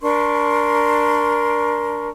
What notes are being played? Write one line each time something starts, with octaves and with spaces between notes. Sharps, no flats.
D4 A#4 C6 C#6